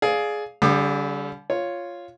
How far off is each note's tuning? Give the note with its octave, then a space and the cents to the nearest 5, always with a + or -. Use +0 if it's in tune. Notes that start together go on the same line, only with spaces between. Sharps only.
G#4 +15 D5 +0 F5 +5
D3 -40 G3 +0 D6 +40
F4 +0 C#5 +0